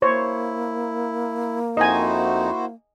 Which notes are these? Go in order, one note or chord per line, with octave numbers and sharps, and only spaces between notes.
A#3 E4 C5 C#5
F2 D#4 E4 F#4 C5 D#5 G#5